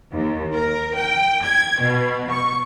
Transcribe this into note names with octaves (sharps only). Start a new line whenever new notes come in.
D#2
A#4
G5
G#6
B2
C#6